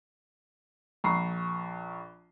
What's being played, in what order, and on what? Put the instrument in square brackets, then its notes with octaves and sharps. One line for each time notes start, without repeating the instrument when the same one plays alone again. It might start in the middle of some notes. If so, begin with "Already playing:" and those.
[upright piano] A#1 A#5 B5 C#6 C7